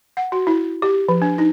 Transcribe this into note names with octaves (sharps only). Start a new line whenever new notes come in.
F#5
F#4
E4
G4
F3
D4
D#4